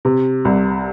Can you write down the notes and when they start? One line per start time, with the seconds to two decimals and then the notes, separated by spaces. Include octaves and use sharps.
0.05 C3
0.45 C2